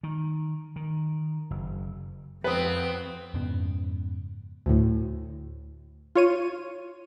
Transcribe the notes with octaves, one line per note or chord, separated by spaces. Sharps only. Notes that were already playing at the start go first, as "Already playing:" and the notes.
D#3
D#3
F#1
F2 B3 C4 B4 D#6
F2 G#2 C#3 B3
D2 A2
F4 C#5 D#7